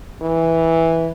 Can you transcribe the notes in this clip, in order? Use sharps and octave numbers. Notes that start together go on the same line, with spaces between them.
E3